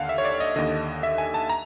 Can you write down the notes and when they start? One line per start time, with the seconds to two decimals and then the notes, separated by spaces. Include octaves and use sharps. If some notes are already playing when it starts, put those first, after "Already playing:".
Already playing: D#2 D3 F5 F#5
0.09 E5
0.18 C#5
0.25 D5
0.40 D#5
0.56 D#2 D3 D#5
1.03 E5
1.18 G#5
1.34 A5
1.50 A#5